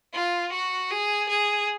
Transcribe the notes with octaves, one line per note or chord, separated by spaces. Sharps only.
F4
F#4
G#4
G#4